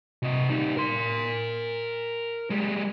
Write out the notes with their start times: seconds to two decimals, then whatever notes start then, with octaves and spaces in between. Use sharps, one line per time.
0.23 C3 D#5
0.49 G3 D#4
0.77 A#4 C6
2.50 G3 G#3